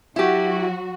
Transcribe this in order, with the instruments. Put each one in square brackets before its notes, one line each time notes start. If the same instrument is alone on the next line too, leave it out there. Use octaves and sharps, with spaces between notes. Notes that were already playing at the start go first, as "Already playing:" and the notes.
[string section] F#3 F#4 [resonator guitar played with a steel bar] E4 G4